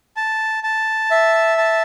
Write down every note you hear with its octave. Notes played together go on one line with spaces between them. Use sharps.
A5
A5
E5
A5